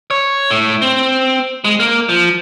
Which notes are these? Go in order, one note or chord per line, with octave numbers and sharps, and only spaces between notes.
C#5
A2
C4
G#3
A#3
F3